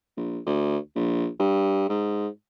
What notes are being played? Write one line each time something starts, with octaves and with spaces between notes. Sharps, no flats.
A#1
D2
A#1
G2
G#2